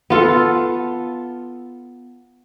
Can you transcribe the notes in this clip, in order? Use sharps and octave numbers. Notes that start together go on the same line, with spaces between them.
B3 F4 A4